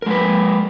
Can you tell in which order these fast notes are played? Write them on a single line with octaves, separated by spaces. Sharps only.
A#4 G#3 B4